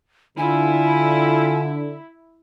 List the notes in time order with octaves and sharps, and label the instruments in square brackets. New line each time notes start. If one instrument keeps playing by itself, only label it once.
[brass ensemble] D3 [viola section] E4 [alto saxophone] F4 [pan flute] G#5